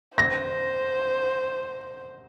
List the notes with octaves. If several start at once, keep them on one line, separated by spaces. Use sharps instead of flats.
C5 A#6